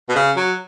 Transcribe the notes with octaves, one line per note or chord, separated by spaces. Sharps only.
B2
C#3
F#3